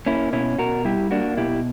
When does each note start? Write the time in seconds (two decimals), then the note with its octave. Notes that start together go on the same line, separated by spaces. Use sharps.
0.06 A#3 C#4 E4
0.33 B2 C#4 E4
0.58 B2 F#4 A#4
0.85 G3 E4 G4
1.11 A#3 D4 F#4
1.37 B2 E4 G4